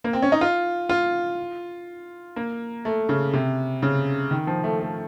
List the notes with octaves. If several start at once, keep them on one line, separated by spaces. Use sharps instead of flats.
A#3
C4
C#4
D#4
F4
F4
A#3
A3
C#3
C3
C#3
D#3
F3
A3
A3